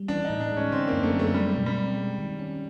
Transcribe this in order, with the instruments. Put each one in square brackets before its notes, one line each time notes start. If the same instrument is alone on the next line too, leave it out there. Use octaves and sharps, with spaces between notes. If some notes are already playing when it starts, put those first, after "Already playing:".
Already playing: [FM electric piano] G3
[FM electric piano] E3 [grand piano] D4
[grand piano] D#4
[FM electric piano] A2
[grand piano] D4
[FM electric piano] G#3
[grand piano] C#4
[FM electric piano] D3 [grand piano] C4
[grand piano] A#3
[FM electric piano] F#2
[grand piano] A3
[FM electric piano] F#3
[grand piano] A3
[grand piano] G3 [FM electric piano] G#3
[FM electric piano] B2
[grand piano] G3
[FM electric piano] C4
G#3
D#3
C#4